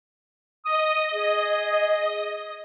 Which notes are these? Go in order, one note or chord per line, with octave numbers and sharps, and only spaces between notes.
D#5 D#6
G#4